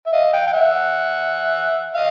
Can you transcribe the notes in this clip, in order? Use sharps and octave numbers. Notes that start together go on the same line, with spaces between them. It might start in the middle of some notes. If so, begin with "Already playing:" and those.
E5
D#5 F5
F5 G5
G5
E5 F#5
D#5 F5